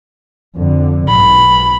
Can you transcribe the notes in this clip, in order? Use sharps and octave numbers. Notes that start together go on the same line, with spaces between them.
F2 D3
B1 G#2 B5